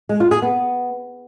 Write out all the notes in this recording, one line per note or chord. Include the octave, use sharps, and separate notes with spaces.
G#3
F4
G#4
B3